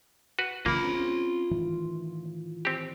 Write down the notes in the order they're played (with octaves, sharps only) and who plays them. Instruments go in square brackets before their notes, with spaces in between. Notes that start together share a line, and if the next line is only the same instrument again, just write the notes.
[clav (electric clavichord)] F#4 B4
[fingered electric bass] B1 C#3 E3 [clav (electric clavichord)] A#3 [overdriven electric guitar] F4 B5
[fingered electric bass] C4 C#4
A2 D#3 E3
[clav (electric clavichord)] C4 G4